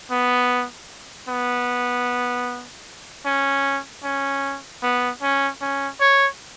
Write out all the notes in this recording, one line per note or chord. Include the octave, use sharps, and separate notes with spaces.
B3
B3
C#4
C#4
B3
C#4
C#4
C#5